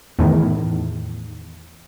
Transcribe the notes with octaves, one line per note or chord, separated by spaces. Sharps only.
E2 A2 D#3